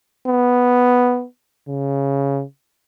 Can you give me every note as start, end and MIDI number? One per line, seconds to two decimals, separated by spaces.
0.27 1.25 59
1.69 2.43 49